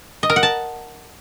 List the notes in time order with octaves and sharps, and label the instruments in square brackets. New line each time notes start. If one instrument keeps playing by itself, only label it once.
[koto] D#5
A#4
F#5
A5